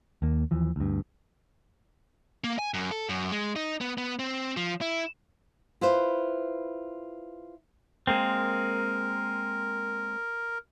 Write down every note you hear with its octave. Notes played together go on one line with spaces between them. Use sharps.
D#2 A#3
D#2 E3 F3
D2 G2
A#3
G#5
F#2
A4
F#2
G#3
D#4
B3
B3
C4
F3
E4
E4 F4 B4 C5
G#3 A#3 C4 A#4